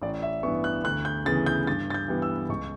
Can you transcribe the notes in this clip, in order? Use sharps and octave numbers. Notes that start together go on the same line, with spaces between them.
A1 D5
E5
G2 E3 B3 C#6
F#6
D2 F#6
G6
C#3 E3 B3 A6
G6
G2 A6
A6
G6
E3 G3 B3
E6
C#2 C#6